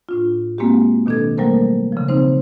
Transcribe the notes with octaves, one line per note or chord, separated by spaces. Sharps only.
A2 D4 F4
G#3 A#3 C4 D4 F#4 G4
B2 D#3 D4 A4 G#6
F#3 G3 A3 A#3 A#4 C5
C#3 F3
C#3 C4 D#4 C5